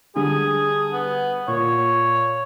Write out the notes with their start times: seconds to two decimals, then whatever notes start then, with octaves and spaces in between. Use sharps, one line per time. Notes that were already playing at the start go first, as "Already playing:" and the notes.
0.16 D3 G3 G#4
0.93 B3
1.48 A#2 C#5